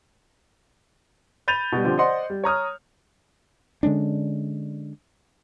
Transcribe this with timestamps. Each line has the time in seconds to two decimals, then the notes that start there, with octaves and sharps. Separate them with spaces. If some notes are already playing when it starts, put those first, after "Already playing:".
1.48 B5 G6 A6 D#7 F7
1.72 B2 G3
1.84 D3 F3 C4 G4
1.98 C5 D5 D#5 F#5 C6
2.30 G3
2.44 C#5 A#5 D#6 F6
3.83 D3 G#3 C#4 D4